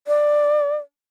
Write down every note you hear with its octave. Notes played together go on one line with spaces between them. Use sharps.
D5